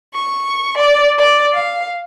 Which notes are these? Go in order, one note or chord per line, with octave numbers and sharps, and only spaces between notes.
C#6
D5
D5
F5